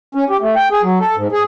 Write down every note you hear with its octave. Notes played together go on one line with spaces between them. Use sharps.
C#4
G4
A3
G5
G#4
F#3
A4
G#2
G#4